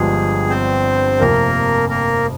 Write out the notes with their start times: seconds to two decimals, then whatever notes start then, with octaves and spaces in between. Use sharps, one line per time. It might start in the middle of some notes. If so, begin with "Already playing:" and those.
Already playing: G1 G2 F3 G#3 G#4
0.49 C4 C5
1.19 F1 F2 C3 A#3 A#4
1.89 A#3 A#4